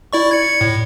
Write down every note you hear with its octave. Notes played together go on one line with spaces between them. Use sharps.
E4 D5 C#6
G#6 C#7
A2